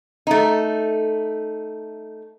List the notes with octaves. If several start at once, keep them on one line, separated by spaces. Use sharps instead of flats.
A3 D#4